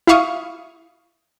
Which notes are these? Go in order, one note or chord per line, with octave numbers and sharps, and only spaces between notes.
E4 E5 F5 C#6 D#6